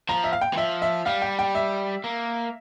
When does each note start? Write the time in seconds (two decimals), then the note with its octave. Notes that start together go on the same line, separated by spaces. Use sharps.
0.09 F3 A#5
0.24 E5
0.32 F5
0.41 G5
0.53 E3
0.57 F3 E5
0.82 E5
1.06 G3 F5
1.22 G5
1.39 G5
1.55 E5
2.04 A#3